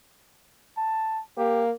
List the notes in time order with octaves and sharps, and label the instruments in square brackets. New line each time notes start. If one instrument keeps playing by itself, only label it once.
[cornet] A5
[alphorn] A#3 [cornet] G4